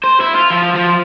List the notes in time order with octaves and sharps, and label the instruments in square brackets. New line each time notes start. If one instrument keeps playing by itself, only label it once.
[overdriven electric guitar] C5
E4
F4
F3
F3